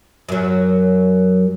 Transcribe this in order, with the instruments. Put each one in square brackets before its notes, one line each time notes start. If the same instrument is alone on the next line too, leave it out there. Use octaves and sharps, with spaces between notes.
[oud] F#2 F#3